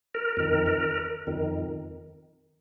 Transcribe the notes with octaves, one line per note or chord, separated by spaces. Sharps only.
A#4
F2 D#3 A#4
A#4
F2 D#3